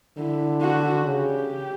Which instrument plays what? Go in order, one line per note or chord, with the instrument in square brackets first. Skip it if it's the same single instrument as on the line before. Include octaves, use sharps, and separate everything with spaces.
[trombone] D3 [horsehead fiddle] E4
[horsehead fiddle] F#4
[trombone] C#3 [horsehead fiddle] G4